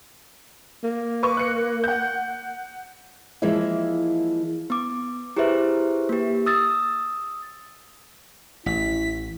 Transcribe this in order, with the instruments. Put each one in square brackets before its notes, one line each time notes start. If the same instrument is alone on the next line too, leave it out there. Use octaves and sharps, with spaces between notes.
[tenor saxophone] A#3
[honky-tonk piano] B4 C#6 D6
F#6 C#7
F#5 G6
[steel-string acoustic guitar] E3 F3 G#3 A#3 E4
[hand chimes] B3 D6
E4 G4 G#4 B4 C5 E5
A#3 G4
D#6 E6 A6
[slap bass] A1 [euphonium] E4 [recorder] B6